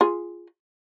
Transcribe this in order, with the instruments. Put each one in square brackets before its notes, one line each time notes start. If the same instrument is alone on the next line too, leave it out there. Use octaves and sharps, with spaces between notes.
[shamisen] F4 G#4